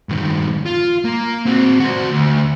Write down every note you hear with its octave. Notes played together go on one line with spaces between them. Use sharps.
G2 D#3
F4
A#3
C4 F#4
F#4 C5
D2